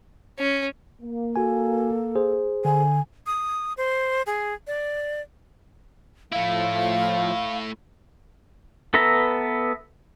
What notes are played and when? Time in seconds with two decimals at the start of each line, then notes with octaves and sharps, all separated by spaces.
0.39 C#4
1.02 A#3
1.36 F#4 A4 G#5
2.16 G#4 C5
2.65 D3 G#5
3.26 D#6
3.77 C5
4.26 G#4
4.67 D5
6.32 A2 F3 A3 E4 F5
8.94 B3 A4 B4 E5 A#5